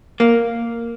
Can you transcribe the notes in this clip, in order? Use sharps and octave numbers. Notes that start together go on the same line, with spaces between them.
A#3